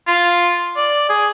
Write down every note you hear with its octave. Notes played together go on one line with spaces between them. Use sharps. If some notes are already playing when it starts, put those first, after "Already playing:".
F4
D5
G#4